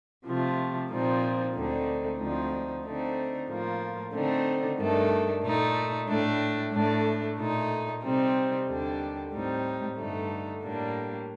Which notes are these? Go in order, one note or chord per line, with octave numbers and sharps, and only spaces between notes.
C3 F3 A3
A#2 F3 C4 D#4
D2 D3 A3 C4 D#4
D2 D3 F3 C4 D#4
D3 A3 C4 D#4
A2 F3 A#3
D3 A3 C4 D#4
G2 D#3 A3 D4
A#2 A3 D#4
A2 A3 D4
A2 A3 D4
A#2 A3 D#4
C3 G3 C4 D#4
D#2 D3 G3 D4
A2 G3 C4 D#4
G2 D3 A3 D#4
A2 G3 A#3 D4